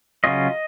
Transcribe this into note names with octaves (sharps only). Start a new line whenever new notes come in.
C#3 F#3 C#4 F4 D#5